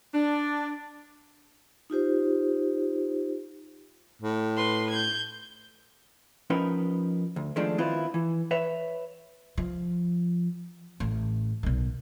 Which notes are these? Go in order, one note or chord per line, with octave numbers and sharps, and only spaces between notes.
D4
D#4 F4 G4 C5
A2
B4 C6
G6 G#6
F3 C#4 D#4 A#4 B4
D2
D#3 F3 G#3 A3 D4
D#3 B3 C4 E4 F4
E3
B4 C#5 E5
F3
A1
B1 D#3